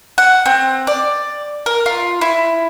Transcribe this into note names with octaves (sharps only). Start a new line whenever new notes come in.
F#5
C4
D5
A#4
F4
E4